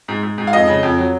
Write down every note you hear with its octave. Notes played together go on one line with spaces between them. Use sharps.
G#2
G#2
G#2
F5
F2 D#5
C#3
F2
F#3